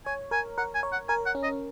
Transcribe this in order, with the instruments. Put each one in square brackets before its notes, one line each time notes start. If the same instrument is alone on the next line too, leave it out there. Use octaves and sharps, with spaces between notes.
[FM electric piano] C#5 [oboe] G#5
[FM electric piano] A#4 [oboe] G#5
[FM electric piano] A#4 [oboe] F#5
[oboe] G#5
[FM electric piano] C#5
[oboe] F#5
[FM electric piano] A#4 [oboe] G#5
[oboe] F#5
[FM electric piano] C#4
[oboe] D#5